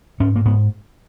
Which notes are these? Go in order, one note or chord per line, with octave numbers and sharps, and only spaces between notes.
G#2 C#4
A#3
G#2 B3